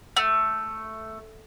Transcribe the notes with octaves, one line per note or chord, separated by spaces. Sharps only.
A3